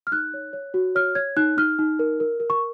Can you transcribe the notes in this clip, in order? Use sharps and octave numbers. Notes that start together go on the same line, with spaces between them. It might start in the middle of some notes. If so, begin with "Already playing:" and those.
F6
D#4 F#6
C#5
C#5
F#4
C#5 F6
C#5 G#6
D#4 F#6
D#4 F6
D#4
A#4
A#4
A#4
C#6